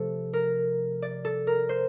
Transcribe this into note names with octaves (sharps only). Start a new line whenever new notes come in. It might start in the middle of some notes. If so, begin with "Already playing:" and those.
Already playing: C3 F3 A3 A4
A#4
D5
A4
A#4
C5